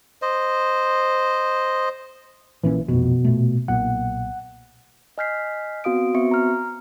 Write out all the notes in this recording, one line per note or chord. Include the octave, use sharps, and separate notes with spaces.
C5 D#5
A#1 A#2 E3 C#4
F1 A#1 F2 B2
A#2 A3
B1 A#2 F#5
D#5 G#5 F6 G6 B6 C7
B3 C4 F#4 F5 D#6 D7
B3 C4 F#4 E5 C#6 C#7
A#5 F6